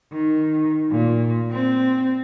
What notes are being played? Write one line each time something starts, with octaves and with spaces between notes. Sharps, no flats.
D#3
A#2
C4